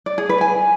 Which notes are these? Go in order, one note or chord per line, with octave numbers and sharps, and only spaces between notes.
D5
G#4
B4
G#5